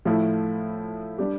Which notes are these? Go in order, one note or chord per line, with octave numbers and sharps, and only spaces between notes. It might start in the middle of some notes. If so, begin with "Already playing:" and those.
A2 F3 A3 E4
G3 D4 G4